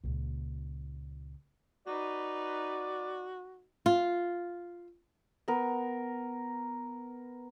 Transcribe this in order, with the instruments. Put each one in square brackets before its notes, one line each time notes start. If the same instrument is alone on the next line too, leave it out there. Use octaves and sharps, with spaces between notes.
[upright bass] C#2 A#2
[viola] D#4 B4 [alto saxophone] F#4 [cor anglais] D5
[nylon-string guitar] F4
[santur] B3 A#4